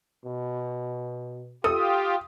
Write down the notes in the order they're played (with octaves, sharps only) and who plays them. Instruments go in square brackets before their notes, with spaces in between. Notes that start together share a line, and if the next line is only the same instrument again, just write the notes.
[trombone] B2
[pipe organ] F4 G4 [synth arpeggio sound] A4 [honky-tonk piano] D#6